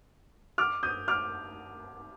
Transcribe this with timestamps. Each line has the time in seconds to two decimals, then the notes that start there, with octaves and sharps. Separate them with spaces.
0.58 D6 F6
0.83 D#6 G6
1.08 D6 F6